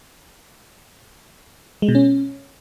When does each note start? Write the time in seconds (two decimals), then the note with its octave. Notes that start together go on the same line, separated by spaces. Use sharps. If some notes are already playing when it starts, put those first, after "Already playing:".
1.82 G#3
1.89 B2
1.95 C#4